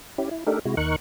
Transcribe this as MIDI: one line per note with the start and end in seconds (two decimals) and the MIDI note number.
0.18 0.29 61
0.18 0.29 64
0.18 0.29 67
0.31 0.44 64
0.47 0.59 57
0.47 0.59 62
0.47 0.59 63
0.47 0.59 67
0.47 0.59 69
0.47 0.59 70
0.65 0.75 48
0.65 0.75 56
0.65 0.75 64
0.65 0.75 66
0.77 0.96 39
0.77 0.96 63
0.77 0.96 70
0.77 0.96 85
0.77 0.96 90